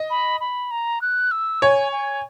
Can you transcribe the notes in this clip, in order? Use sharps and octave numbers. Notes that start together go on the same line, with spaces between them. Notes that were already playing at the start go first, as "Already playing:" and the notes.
Already playing: D#5
B5
B5
A#5
F#6
E6
C#5 G#5
G#5